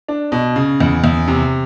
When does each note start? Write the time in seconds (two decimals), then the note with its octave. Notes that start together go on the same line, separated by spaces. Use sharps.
0.08 D4
0.32 B2
0.56 C#3
0.80 E2
1.04 E2
1.28 C3